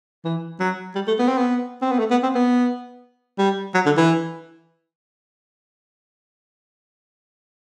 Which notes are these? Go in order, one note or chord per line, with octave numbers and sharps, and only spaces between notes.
E3
F#3
G3
A3
B3
C4
B3
C4
B3
A3
B3
C4
B3
G3
F#3
D3
E3